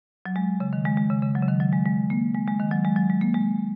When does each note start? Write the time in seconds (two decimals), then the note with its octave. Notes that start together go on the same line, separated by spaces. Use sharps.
0.26 F#3
0.36 G#3
0.60 C#3
0.73 D#3
0.85 G#3
0.97 G#3
1.10 C#3
1.22 C#3
1.35 F#3
1.42 C#3
1.48 D#3
1.60 F#3
1.73 G#3
1.85 G#3
2.10 A#3
2.35 G#3
2.48 G#3
2.60 D#3
2.71 F#3
2.85 G#3
2.96 F#3
3.10 G#3
3.21 A#3
3.34 G#3